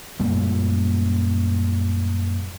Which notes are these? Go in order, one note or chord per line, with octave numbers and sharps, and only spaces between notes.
F#2 A#2 G3 A3